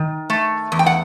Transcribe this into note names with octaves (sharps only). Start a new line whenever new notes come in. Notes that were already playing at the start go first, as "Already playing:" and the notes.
Already playing: D#3
A3
E2
G5
F#5